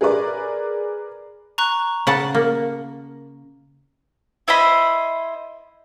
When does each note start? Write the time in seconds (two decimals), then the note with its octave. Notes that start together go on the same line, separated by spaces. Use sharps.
0.01 G#4 A#4 B4 D5
1.58 A#5 C#6 F#6
2.07 C#3 F#5 A5
2.35 A#3
4.48 E4 C5 D#5 B5